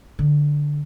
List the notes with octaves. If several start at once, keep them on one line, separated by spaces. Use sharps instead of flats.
D3